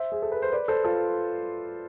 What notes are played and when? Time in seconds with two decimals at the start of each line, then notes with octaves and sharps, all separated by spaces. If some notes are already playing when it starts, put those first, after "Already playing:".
Already playing: C5 E5
0.12 G#4
0.22 A4
0.32 B4
0.42 C5
0.52 B4 D5
0.68 A4 C5
0.84 F4 A4